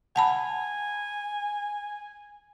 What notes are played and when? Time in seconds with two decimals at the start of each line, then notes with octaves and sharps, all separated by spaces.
0.16 F#5 G#5 A5 B5